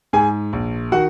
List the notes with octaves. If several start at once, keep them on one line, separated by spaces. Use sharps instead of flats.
G#2 G#4 G#5
A#1
D#3 F#4 F#5